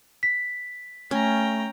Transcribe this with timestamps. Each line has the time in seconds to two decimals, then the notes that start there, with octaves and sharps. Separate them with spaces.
0.23 B6
1.11 A3 C#4 G5 A#5